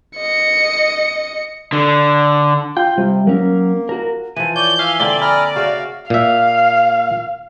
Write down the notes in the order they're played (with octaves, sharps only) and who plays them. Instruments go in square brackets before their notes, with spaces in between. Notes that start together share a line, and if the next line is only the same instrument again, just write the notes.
[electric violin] D#5 C#7
[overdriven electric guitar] D3
[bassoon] F4 [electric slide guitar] G5
[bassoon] C3 [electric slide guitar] G3
[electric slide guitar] F#3 C#4 A#4 [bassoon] A#3
[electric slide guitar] F#4 A#4
[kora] E3 F3 [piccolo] D#7
[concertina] C#5 D5 [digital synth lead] G6 [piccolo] G7
[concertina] E5 G#5 [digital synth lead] F5
[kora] D3 A#3 C4 [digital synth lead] D5
[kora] E5 [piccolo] G#5 [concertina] A#5 B5 F6
[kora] C#3 [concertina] F#4 F5 [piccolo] E5
[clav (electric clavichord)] A#2 E5 [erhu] F5